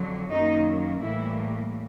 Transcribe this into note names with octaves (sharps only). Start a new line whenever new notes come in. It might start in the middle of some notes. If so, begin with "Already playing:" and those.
Already playing: F2 D3 F#3
F#2 D#3 F#3 A#3 D#4
A2 E3 G3 A#3 E4